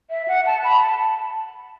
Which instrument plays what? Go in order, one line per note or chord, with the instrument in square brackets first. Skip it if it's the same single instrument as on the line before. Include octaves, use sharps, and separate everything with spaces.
[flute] E5
F#5
A5
B5
A5